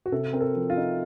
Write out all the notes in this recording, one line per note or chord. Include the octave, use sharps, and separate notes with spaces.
F#4
C3 A4
C4 A#4
A4
F3
F4
D#4